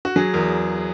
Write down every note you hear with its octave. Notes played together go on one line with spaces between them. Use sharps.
F#4
F#3 G#4
E2 A#4